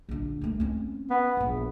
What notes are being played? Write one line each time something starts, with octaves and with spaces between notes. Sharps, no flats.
A#1 D3
D#2 A3
C4 C#4
B3
D#1 A#1